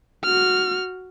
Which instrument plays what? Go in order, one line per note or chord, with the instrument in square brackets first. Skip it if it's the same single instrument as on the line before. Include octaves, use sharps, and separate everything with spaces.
[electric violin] F#4 F6